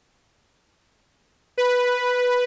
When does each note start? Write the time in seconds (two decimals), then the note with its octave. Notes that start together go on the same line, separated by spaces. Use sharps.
1.58 B4